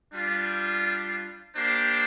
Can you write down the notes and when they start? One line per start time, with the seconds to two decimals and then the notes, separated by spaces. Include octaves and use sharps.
0.14 G3 D4 F4
1.56 A#3 D4 G4 C5